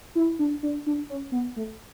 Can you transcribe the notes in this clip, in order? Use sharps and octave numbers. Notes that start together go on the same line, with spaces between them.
E4
D4
D4
D4
C#4
B3
A3